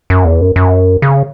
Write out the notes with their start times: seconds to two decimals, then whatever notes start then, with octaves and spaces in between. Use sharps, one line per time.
0.10 F#2
0.25 E2
0.41 F#2
0.56 F#2
1.02 C#3